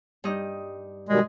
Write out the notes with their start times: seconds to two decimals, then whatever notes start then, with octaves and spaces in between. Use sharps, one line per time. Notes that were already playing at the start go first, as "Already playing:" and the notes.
0.24 G2 D#4 D#5
1.09 B2 D#3 G3 G#3